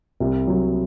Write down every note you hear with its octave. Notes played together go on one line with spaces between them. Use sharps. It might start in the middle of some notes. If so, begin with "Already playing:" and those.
C2
F#3